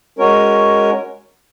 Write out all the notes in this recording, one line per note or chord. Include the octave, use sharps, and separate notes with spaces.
G#3 C#4 F#4 A#4 C#5